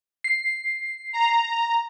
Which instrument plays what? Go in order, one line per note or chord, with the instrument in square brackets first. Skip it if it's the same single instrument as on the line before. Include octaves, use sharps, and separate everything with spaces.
[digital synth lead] C7
[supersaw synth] A#5